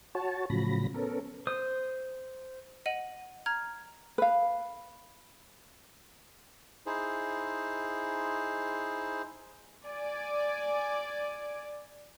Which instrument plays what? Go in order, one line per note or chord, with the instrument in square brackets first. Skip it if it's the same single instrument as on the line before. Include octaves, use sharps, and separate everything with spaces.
[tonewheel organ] F#4 C#5 A5
A2 C#3 F3 F#3 B5 A#6
B3 C#4 A4 A#4
[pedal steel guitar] C5 D#6
[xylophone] D#5 F#5 D#7 F#7
A#5 F6 G#6
[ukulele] B4 F5
[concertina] D#4 E4 G#4 C5
[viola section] D5 G#5